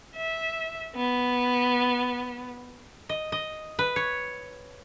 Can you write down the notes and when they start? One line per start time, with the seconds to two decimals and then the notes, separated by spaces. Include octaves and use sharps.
0.16 E5
0.95 B3
3.09 D#5
3.32 D#5
3.79 B4
3.96 C#5